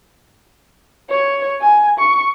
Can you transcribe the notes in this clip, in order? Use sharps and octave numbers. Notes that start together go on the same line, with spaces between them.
C#5
G#5
C#6